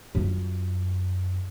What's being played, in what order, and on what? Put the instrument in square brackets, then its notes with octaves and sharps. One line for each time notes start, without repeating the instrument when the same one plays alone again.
[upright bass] F#2 F4